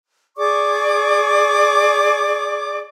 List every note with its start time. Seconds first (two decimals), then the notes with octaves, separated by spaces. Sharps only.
0.38 G#4 D5 C#6 D6